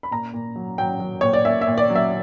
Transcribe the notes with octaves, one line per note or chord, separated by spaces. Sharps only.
B5
A#2 A#5
A#2
F#3
F#3 G5
F#3
A#2 C#5
D5
A#2 E5
E5
A#2
D5
F#3
E5